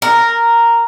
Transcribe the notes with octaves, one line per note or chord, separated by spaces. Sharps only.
A#4